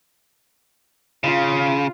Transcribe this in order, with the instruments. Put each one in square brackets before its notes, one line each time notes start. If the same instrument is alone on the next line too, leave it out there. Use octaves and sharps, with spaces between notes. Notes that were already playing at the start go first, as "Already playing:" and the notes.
[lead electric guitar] C#3 [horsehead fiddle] F4